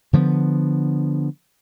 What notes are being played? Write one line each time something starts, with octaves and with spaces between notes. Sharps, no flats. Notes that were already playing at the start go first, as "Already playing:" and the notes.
D3 F3 A3 B3